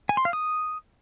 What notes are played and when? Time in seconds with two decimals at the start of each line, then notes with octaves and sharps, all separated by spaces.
0.09 G#5
0.17 C6
0.25 F5
0.33 D#6